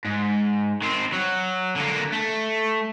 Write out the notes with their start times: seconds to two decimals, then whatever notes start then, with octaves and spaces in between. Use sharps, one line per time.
0.05 G#2
0.82 D#3 C4
1.13 F#3
1.76 D3 A#3
2.13 A3